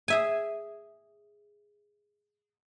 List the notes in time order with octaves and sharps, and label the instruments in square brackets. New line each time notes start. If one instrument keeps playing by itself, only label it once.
[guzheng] G#4 E5 G#5